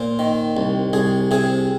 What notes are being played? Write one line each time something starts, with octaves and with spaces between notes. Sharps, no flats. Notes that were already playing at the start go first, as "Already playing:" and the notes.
Already playing: A#2 C5
D#3
C2
C2 G#4
C3 G#4